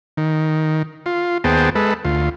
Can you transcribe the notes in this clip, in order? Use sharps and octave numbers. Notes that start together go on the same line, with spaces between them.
D#3
F4
D#2 B3 G#4 C5 G5 A5
G#3 A4 B4
D2 F4